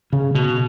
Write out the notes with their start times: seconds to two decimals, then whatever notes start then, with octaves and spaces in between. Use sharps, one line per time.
0.13 C#3
0.35 B2